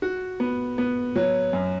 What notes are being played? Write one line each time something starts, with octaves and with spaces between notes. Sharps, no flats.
F#4
B3
B3
F#3
F#2